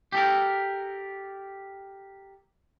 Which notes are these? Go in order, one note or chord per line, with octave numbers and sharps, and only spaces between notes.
G4 A4 A#4